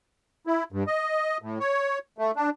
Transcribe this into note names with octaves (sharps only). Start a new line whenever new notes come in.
E4
G2
D#5
A2
C#5
A3
D4